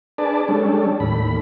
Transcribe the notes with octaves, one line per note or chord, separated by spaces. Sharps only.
D4 G#4 B4 D5 A5
G3 G#3 C#4 D4 A4
D#2 A2 B5